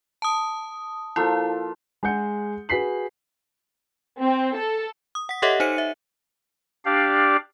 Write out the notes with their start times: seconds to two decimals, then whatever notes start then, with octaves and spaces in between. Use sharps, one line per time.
0.22 A5 D#6
1.16 F3 A#3 E4 A4
2.03 G#3 G#4 F#5 G6 C#7
2.69 F#4 G#4 B4 B6 C7 F#7
4.20 C4
4.56 A4
5.15 D#6
5.29 F#5 B6
5.42 G4 A4 C#5 D#5 E5 F#5
5.60 D#4 C5 C#7 D#7
5.78 E5
6.85 D4 G4 D5 F5